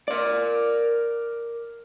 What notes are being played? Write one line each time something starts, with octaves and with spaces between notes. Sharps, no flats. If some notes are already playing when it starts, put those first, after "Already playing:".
A#4 D5